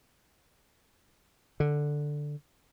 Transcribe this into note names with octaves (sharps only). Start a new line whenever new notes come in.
D3